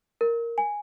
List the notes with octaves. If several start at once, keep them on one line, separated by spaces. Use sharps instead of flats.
A#4
G#5